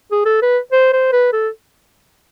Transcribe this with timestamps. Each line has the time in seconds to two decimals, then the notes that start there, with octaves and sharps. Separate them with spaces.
0.12 G#4
0.26 A4
0.42 B4
0.72 C5
0.93 C5
1.12 B4
1.33 A4